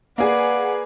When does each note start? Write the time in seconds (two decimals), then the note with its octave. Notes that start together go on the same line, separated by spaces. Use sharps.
0.18 A#3 G#4 B4 D5 F#5